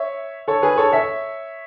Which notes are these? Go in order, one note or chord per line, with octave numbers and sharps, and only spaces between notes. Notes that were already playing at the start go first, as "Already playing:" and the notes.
Already playing: C#5 E5
A4 C#5
G#4 B4
A4 C#5
C#5 E5